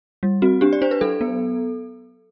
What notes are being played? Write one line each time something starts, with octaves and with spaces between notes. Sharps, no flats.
G3
C4 F#4
D4 G4
D5
D4 C5
B4
F#3 A4
B3